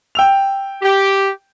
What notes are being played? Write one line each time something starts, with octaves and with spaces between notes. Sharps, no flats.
G5 E6 F7
G4